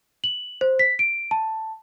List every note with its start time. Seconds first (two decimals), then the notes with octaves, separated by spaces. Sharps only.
0.24 F#7
0.61 C5
0.79 B6
0.99 D7
1.31 A5